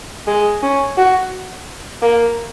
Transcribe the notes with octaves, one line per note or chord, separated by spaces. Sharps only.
G#3
C#4
F#4
A#3